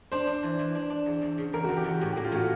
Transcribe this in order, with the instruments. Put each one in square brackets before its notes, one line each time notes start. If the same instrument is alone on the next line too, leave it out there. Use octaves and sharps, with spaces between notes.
[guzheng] D4 [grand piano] C5
[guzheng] D4
E3
E3
D4
D4
E2
E2
C#3
[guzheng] E2 [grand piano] A#4
[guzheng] E2 [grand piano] F#4
[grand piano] G4
[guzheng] E2
[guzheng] A2 [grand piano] G4
[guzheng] A#3 [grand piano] G4
[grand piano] F4
[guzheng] A2 [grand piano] F#4